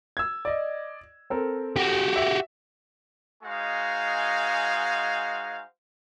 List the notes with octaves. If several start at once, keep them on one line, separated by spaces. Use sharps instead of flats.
E6 G#6
D5 D#5
C4 A4 A#4
F#4 G4
E5
G#3 D#4 F#4 C5 F5 G#5